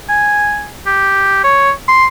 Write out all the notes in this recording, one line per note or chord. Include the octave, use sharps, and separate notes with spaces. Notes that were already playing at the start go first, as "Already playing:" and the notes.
G#5
G4
C#5
C6